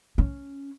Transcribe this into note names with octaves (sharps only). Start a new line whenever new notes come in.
C#4